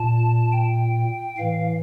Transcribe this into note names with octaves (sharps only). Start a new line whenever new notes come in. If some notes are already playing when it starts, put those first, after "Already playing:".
Already playing: A#2 A5
G5
A2 E3 F5